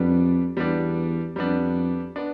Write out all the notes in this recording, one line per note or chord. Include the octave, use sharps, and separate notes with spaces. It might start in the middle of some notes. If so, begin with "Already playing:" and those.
Already playing: F2 G3 B3 D4
E2 G3 B3 D4
F2 G3 B3 D4
B3 D4